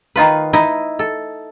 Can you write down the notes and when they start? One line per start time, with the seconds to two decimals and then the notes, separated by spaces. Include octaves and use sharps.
0.16 D#3 D#4 F4 B4
0.53 D#4 E4 D#5
0.99 A4